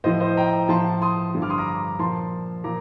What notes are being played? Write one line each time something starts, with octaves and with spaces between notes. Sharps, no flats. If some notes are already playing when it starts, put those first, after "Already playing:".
A2 F3 C5 D#5
C5 D#5
G5 A#5
A2 F3 A5 C6
C6 D#6
G2 D3 F3
D6 F6
C6 D#6
A#5 D6
A#2 F3 A5 C6
A#2 F3 A#5 D6